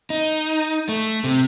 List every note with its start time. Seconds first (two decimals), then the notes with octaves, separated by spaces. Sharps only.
0.10 D#4
0.89 A3
1.24 C3